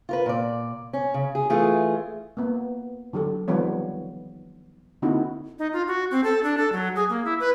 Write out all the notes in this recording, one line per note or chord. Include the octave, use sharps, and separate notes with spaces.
F4 A#4 B4
A#2 D5
C#4
C#3
G#4
E3 A3 F4 G#4
A#3 B3
D3 F#3 G4 A4
D#3 F3 G3 B3 C#5
D3 A#3 C4 D#4 E4 F#4
D#4
F4
F#4
C4
A4
D4
A4
F#3
G#4
A#3
E4
B4